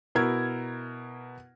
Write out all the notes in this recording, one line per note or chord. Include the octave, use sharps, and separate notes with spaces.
B2 E4 A#4 G#6